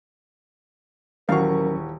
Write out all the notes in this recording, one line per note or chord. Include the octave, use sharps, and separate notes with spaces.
D#1 E3 F#3 C#4 F#4 A#4 F5 C#6